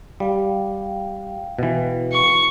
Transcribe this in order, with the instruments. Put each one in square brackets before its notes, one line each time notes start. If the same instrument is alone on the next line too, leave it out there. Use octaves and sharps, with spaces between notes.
[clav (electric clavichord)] G3 [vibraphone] F5 G5
[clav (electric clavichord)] B2 E3
[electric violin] C#6